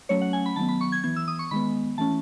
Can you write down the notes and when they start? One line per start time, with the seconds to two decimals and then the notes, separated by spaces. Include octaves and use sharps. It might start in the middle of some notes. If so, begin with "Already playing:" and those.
0.09 F#3 A3 C#4 C#5
0.22 F#5
0.33 G#5
0.46 B5
0.56 D#3 F#3 B3 A5
0.69 B5
0.81 C#6
0.92 G#6
1.04 E3 B3 G#6
1.16 E6
1.28 D#6
1.39 C#6
1.51 D#3 G#3 B3 B5
1.98 E3 A3 C#4 A5